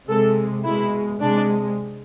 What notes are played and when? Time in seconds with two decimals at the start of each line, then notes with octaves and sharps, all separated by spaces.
0.08 C3 G#3 A4
0.65 B2 G#3 E4
1.21 C3 G#3 D4